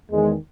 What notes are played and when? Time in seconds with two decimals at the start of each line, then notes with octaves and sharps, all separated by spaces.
0.11 E2 D#3 G#3